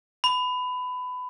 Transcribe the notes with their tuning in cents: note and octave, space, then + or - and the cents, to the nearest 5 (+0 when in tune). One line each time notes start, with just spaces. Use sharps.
B5 +20